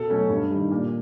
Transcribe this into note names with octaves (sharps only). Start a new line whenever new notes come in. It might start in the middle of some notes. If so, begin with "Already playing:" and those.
Already playing: B2 A4
F#3 A3 C#4
G2
D#3 G3
A#2